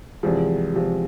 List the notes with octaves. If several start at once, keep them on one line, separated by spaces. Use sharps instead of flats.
E2 C3 F3 G#3
E2 C3 F3 G#3